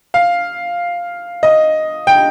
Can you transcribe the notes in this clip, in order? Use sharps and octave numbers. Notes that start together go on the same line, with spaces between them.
F5
D#5
G5